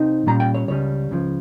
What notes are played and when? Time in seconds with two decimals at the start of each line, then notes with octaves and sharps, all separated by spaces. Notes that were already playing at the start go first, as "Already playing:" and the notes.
Already playing: C3 C4 D#4
0.26 A#2 G3 C#4 A#5
0.40 G5
0.54 C#5
0.68 C#2 C#3 G3 C#4 C#5
1.11 C#2 C#3 F3